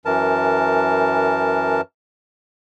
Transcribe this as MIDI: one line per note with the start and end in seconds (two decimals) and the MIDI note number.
0.05 1.81 42
0.05 1.81 52
0.05 1.81 70
0.05 1.81 81